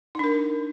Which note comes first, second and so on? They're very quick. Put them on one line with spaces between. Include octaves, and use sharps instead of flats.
D#4 D4 A#4